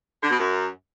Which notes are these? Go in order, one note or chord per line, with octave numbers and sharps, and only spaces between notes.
D3
B2
F#2